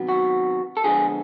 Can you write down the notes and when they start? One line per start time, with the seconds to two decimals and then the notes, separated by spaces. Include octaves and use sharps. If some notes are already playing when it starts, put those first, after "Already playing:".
Already playing: C3 D#3 F#3 B3
0.08 F#4
0.77 A4
0.84 D3 F3 G#3 B3 G#4